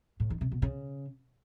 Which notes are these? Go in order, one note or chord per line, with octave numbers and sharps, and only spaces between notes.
A2
D#3
C3
B2
C#3